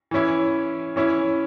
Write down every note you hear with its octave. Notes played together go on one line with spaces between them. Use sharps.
E3 C#4 E4
E3 C#4 E4